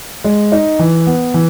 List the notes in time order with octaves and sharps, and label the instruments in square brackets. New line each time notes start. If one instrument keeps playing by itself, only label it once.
[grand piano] G#3
D#4
E3
B3
E3